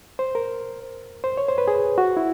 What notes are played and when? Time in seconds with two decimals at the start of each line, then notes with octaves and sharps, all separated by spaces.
0.19 C5
0.35 A#4
1.24 C5
1.38 C#5
1.48 C5
1.58 B4
1.68 G#4
1.98 F#4
2.17 E4